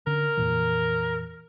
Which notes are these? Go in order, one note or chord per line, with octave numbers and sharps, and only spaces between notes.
D3 C#4 A#4
F2 A#2 E3